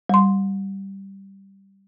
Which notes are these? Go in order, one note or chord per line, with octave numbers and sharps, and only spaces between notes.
G3 C6